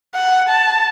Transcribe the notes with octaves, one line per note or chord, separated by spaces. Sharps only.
F#5
A5